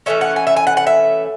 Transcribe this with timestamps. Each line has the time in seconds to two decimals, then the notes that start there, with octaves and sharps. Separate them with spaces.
0.06 E3 A3 C#4 E5
0.21 F#5
0.36 G#5
0.47 E5
0.56 G#5
0.67 F#5
0.77 F#5
0.87 E5